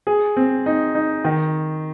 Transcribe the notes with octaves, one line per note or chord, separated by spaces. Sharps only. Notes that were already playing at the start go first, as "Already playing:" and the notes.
G#4
C4
D#4
D#4
D#3